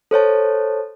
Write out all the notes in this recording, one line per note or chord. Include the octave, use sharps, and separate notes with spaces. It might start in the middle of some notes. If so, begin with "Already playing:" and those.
A4 C5 C#5 A5